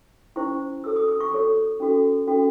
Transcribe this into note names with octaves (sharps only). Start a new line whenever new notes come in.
C#4 E4 C5 C#6
F#4 A4 C#5 E6
D#6
D#6
C#6
F#4 A4 C#5 C#6
C#4 F#4 A4
C#4 F#4 A4